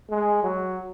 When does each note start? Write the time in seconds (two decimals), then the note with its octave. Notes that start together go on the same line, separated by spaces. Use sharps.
0.10 G#3
0.43 F#3